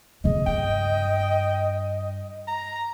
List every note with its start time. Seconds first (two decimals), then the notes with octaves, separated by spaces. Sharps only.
0.24 C#3 B3 D#5
0.47 G2 G5
2.48 A#5